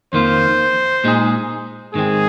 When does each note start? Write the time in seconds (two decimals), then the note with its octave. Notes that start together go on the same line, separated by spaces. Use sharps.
0.13 F2 D#3 A#3 F4 C5
1.04 A#2 G#3 D#4 G#4
1.94 G#2 D#3 G#3 C4 G#4